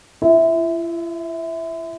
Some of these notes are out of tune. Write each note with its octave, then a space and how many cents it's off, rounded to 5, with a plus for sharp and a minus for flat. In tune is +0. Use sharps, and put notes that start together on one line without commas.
E4 +45 E5 -10